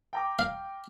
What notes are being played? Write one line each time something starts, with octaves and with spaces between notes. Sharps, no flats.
G5 A#5 D6
F5